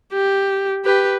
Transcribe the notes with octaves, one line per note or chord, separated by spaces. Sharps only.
G4
G4 B4